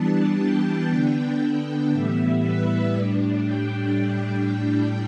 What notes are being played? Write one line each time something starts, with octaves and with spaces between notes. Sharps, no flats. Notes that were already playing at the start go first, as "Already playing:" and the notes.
Already playing: E3 G3 B3 D4 A5
G5
D3 B3 D4
G5
A2 E3 G3 B3 E5
B4
A2 G3 D4
G5